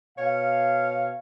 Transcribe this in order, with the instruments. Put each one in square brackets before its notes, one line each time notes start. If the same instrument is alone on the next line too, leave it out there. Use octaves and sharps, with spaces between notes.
[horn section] B2 C#5 F5